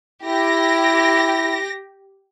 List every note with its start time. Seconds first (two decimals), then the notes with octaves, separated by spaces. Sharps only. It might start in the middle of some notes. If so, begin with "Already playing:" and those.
0.24 E4 G4 A#6